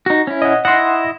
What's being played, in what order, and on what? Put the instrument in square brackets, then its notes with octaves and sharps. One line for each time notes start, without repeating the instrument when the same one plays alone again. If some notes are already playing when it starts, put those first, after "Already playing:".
[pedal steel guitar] D#4 F#4
C#4 E4
[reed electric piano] D#5 F#5
[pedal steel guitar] E4 D#5 [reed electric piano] F#5 C6